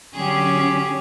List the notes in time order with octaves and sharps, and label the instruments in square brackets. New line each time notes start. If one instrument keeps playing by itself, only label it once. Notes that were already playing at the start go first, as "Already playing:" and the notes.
[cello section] D3 F#3 C#4 [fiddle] G4 G#4